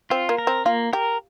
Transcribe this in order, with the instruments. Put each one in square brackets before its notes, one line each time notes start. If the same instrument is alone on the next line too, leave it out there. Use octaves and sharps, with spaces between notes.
[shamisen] C4 [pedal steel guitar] F4
[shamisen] A#3
[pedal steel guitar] A#4
[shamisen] C4
[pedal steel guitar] A#3 [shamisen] F4
[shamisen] G4 [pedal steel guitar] A#4